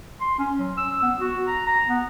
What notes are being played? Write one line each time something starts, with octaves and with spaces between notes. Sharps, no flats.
C6
C#4
F#3
E6
B3
F#4
A#5
A#5
B3